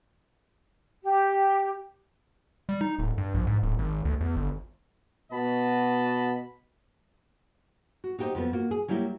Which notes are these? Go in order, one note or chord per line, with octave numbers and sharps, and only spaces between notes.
G4
G3
D#4
D1
G2
A#1
G#2
D1
G#1
D2
E2
G1
B2 B3 F#4 D#5 A5 B5
F#4
D#4 F#4 G4 A4 C5 D#5
F2 F3 B3
A#3 F4 F#4
G#4
F#3 G3 A#3 E4 G4